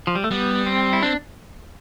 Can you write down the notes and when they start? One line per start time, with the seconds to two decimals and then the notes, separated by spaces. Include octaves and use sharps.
0.07 F3
0.15 G3
0.24 A3
0.31 G3 B3
0.66 C4
0.93 E4
1.03 C4 D4